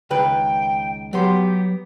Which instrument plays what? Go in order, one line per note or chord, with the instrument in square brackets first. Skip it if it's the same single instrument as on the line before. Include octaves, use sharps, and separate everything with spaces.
[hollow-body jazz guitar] C#2 D#3 B4 [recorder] G5
[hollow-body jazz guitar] F#3 B3 C6 [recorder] G4